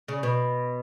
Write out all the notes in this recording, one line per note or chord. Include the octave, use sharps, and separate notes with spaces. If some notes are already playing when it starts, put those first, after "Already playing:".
C#3
B2